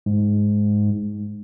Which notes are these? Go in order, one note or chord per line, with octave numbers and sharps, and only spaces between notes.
G#2